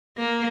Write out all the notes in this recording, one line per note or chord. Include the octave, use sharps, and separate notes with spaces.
A#3